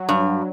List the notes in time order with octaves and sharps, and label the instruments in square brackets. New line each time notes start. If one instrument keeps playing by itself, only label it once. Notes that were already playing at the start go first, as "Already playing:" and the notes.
Already playing: [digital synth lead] F#3
[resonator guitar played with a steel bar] G2